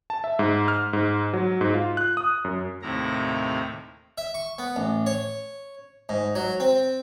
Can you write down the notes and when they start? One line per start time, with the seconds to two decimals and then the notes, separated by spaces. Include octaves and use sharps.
0.10 A5
0.24 E5
0.39 G#2
0.68 F6
0.93 G#2
1.33 F#3
1.61 G#2
1.74 F4
1.97 F#6
2.17 D#6
2.45 F#2
2.82 D#2 A2 C3 E4 A#5
4.18 E5
4.34 C#6
4.58 B3
4.76 A1
5.06 C#5
6.09 G#2
6.35 F#3
6.60 C4